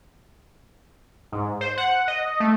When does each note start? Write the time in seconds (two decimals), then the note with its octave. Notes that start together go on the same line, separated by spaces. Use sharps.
1.32 G#2
1.61 C5
1.78 F#5
2.08 D#5
2.40 A3